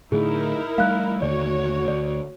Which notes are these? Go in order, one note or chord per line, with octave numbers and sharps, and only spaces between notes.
A2 D3 A3 D#4 E4 G#4 A#4
G3 A3 F5 F#6
D#2 D3 A3 F#4 C#5 D5
D2 D5